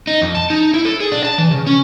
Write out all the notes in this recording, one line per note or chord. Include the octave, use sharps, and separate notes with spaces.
D#4
F2
A5
D#4
E4
A4
G#4
D4
A5
E3
C#3
C#4